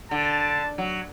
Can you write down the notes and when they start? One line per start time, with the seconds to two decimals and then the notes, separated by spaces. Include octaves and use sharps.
0.11 D3 A5
0.78 F#3